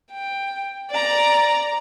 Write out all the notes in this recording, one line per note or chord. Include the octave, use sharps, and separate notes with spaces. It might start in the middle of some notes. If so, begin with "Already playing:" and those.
G5
D5 A#5